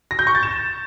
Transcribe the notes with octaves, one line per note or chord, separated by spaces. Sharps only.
A#6
G6
C#6
A6
E7